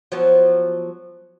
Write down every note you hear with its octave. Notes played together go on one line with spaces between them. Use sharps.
F3 F#3 B3